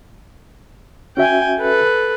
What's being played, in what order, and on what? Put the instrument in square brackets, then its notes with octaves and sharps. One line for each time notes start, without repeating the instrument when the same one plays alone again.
[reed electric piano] C#4 F#4 E5 [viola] G5 G#5
[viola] A4 B4